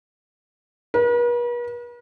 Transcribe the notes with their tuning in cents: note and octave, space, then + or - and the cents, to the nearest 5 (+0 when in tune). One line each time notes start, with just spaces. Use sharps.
B4 -45